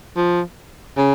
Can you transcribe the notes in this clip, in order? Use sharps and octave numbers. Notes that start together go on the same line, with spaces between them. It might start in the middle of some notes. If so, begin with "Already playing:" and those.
F3
C#3